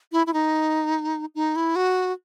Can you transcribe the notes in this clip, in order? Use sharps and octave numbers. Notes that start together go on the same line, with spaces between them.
E4
E4
D#4
D#4
E4
F#4